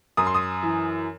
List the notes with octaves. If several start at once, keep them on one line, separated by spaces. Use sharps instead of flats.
F#2 D#6
C6
D#6
E3